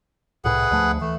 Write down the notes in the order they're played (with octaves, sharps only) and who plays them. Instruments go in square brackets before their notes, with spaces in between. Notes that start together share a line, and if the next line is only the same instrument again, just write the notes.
[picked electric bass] C2 A2 [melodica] G#4 B4 F#5
[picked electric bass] D2 F3 A3
[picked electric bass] E3 [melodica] A3